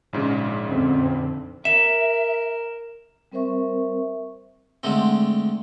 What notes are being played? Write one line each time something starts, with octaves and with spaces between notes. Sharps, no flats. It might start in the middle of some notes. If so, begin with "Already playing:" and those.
A#1 G#2 C#3
F2 D3 C4
A#4 E5 E7
G3 C4 A#4 C5 E5 C#6
D3 G#3 A3 C4